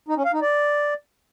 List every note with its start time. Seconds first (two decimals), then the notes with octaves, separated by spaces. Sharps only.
0.08 D#4
0.17 C#4
0.25 F5
0.33 D#4
0.42 D5